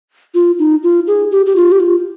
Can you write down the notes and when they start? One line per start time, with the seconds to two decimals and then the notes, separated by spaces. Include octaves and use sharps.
0.34 F4
0.59 D#4
0.83 F4
1.07 G#4
1.32 G4
1.46 G4
1.56 F4
1.72 G4
1.80 F4